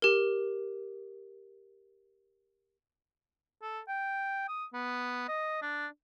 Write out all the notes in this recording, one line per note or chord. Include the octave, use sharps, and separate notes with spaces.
G4 A#4
A4
G5
D#6
B3
D#5
D4